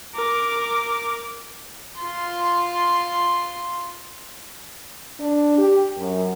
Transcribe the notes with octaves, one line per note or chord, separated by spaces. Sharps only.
A#4 D6
F4 C6
D4
G4
F#2